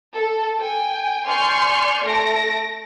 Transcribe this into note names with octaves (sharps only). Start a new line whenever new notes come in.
A4
G5 G#5
D5 G#5 C6 C#6 F6 G6
A3 A4 A#6 D7